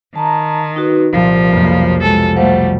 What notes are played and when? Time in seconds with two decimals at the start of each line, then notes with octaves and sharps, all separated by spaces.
0.16 D#3 A5 A#5
0.76 D#4 F#4 B4
1.13 C2 A#2 F3 F5
1.53 B1 F2 C3 A#3
2.03 G#3 A4
2.36 G3 A3 C5 F5 F#5